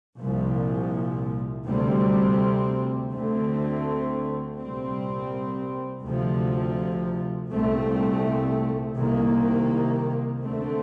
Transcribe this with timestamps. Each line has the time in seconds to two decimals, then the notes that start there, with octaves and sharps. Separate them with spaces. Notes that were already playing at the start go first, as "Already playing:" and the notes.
0.20 C2 A#2 F3
1.67 D2 C3 G3 C4
3.13 D2 D3 A3 C4
4.58 C2 A#2 G3 C4
6.04 D2 C3 F3
7.51 C2 A#2 A3 C4
8.95 C2 C3 D#3 A#3
10.43 D2 D3 A3 C4